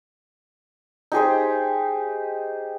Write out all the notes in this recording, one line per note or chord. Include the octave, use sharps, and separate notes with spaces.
D#4 G4 G#4 C5